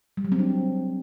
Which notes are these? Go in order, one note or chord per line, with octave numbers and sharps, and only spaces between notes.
G3
F#3
C4
D4